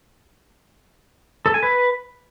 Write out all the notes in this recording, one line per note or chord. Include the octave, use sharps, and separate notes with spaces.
A4
G#5
B4